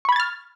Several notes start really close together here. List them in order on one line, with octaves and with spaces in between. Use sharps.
C#6 B5 G#6 A6 F6